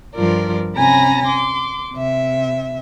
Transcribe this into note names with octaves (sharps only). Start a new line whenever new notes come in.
G2 F3 F4 A#4 D5
C3 C#4 G#5 A#5 B5 A#6
C6 D6
C3 E5